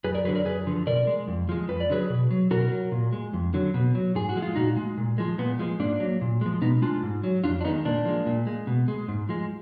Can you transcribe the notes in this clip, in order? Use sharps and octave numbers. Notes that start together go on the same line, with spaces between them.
F#2 G#4 B4
A#4 D5
D3 F#3 G#4 B4
A#4 D5
F#2 G#4 B4
D3 F3
B2 A#4 D5
G#3
F2
F3 G#3
F2 B4
D5
D3 F#3 G#4 B4
B2
F#3
B2 F#4 A#4
F#3
A#2
G#3
F2
D3 F#3
B2
F#3
G#2 G#4
F#4
F3 G#3
F4
A#2 D#4 F#4
G#3
A#2
F3 G#3
A#2 B3
F3 G#3
G#2 A#3 D4
F#3
A#2
F3 G#3
B2 B3 D#4
G#3 D4 F4
G#2
F#3
F2 D4 F4
D4
D#3 G#3 B3 D#4
A#2 A#3 D4
F3 G#3
A#2
G#3
B2
G#3
G#2
F3 G#3